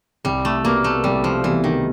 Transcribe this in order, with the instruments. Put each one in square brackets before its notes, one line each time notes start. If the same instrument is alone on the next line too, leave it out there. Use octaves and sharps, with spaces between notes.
[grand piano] C2 [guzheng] G3
[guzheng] A3
[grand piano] B2 G3 B3 [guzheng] A#3
[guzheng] A3
[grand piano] C2 [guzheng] G3
[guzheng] F3
[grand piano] B2 G3 B3 [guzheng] E3
[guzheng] D#3